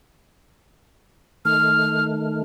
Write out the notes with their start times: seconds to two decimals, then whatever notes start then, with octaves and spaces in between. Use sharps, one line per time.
1.45 D#3 A3 F6